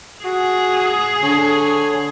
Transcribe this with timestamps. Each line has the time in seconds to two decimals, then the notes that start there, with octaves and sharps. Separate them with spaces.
0.24 F#4 G#4
1.23 D3 C#5 G#5